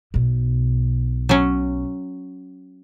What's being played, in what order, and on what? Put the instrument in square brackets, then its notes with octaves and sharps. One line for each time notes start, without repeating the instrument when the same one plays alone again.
[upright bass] B1 B2
[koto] F#3 C#4